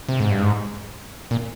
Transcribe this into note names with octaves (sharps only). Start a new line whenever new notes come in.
C3
G#2
G2
G#2
A#2